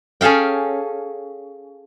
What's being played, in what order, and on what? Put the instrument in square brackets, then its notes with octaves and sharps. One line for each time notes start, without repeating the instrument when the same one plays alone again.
[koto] C#4 G#4 A4 F5 G5